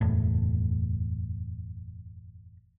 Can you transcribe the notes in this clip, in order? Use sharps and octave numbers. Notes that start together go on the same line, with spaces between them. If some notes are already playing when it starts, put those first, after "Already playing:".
F#1 E2 A2